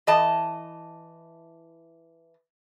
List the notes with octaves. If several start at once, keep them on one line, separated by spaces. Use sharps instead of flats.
E3 D#5 A5